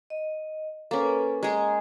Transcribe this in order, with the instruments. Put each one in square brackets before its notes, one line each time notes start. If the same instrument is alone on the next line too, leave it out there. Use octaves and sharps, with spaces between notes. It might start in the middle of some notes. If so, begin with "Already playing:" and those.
[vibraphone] D#5
[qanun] A#3 C#4 [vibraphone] A4 B4
[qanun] G#3 G#4 [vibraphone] A#5